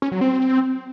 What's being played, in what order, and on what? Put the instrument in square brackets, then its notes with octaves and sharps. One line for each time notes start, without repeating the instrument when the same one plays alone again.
[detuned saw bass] C#4
F#3
C4